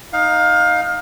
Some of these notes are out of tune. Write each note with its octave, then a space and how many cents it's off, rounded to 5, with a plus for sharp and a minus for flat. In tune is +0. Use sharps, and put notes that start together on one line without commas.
D#4 +0 F5 +20